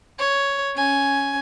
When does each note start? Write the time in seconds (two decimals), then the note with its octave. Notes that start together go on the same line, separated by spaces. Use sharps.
0.19 C#5
0.75 C#4 G#5